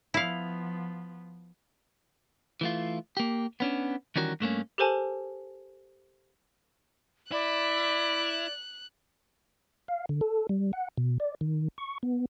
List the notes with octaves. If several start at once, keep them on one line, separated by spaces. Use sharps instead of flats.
F3 B3 E4 F5
E3 A3 F4
A#3 G4
B3 C#4 D4
D#3 E3 G3 C#4 F#4 A#4
G2 A3 A#3 C#4
G4 A4 A#4 C5 G#5 A5
E4 D5 B5 F#6
F5
D3
A4
G3
F#5
B2
D5
D#3
C#6
B3